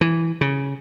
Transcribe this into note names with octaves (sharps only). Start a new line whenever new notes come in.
E3
C#3